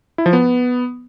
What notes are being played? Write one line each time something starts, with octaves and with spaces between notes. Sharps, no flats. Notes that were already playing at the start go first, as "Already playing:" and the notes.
E4
F3
B3